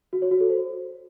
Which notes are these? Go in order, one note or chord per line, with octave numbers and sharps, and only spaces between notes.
F#4
C#5
F#4
A4
C5